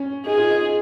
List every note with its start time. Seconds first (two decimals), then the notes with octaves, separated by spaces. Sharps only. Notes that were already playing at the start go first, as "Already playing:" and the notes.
Already playing: C#4
0.25 D#4 G#4
0.38 F4
0.49 D#4